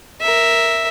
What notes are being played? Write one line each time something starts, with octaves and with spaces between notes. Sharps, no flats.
A#4 E5